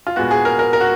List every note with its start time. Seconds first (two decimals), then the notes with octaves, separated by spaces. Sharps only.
0.07 F4
0.16 A#2 G#3 B3 F#4
0.31 G#4
0.45 A#4
0.59 A#4
0.73 A#4
0.80 F#4